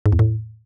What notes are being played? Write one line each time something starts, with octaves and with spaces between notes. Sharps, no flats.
G#2
E2
A2